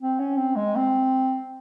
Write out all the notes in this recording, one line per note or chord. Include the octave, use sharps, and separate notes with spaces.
C4
C#4
C4
G#3
C4